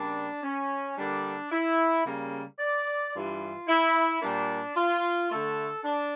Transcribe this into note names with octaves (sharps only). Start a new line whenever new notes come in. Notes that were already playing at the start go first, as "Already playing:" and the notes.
Already playing: C#3 G3 A#3 D4
C#4
D3 G3 A#3 D4
E4
C#3 G3 A#3
D5
G2 E3 G3 F4
E4
A#2 G3 A#3 D4
F4
D3 A3 A4
D4